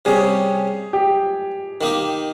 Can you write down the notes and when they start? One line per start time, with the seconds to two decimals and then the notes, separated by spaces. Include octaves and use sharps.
0.05 C3 G3 C#4 G#4
0.93 G4
1.81 D#3 A#3 D#4 G4